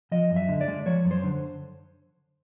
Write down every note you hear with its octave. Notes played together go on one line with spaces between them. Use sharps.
F3 D#5
F#2
E5
D3
D5
G#3
F3 C#5
F#2
C5
D3